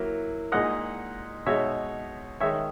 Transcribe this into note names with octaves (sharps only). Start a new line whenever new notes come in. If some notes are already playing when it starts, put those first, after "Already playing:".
Already playing: F#3 A#3 E4
A#2 G#3 D#4 D#5 F#5
B2 G#3 D#4 C#5 E5
D#3 G#3 D#4 C#5 E5